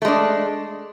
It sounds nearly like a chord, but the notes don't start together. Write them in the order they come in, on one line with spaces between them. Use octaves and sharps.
A3 G#3 D4